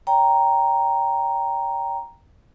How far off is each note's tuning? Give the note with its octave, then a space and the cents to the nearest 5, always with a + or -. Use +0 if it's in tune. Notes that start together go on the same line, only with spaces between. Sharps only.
C#5 +45 G5 +0 A#5 +0